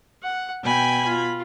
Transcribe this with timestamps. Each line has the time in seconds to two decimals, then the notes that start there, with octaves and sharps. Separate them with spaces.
0.23 F#5
0.64 B2 G5 G#5 B5 G#6
1.06 F4